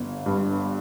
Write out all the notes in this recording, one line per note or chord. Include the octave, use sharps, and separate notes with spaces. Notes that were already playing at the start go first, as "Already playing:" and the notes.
Already playing: G1 D3
G2